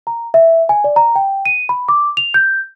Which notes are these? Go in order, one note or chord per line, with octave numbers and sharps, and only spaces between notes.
A#5
E5
G#5
D5
A#5
G5
D#7
B5
D6
F7
G6